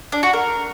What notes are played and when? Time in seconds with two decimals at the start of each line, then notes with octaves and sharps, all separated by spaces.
0.12 D4
0.23 F#4
0.33 A#4